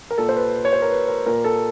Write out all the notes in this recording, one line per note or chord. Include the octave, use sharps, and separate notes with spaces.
A#4
A#2 A4
C5
B4
C#5
C5
A#4
B4
A#4
A#2 A#4
A4